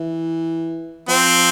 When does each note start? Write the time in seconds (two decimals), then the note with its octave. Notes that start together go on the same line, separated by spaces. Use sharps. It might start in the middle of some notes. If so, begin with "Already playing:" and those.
Already playing: E3
1.08 F3 C4